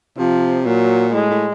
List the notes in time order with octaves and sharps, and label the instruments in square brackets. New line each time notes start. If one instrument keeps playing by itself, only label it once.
[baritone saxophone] C3 [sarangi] F3
[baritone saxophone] A#2 [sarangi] F#3
[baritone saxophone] A2 [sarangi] G#3
[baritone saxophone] A2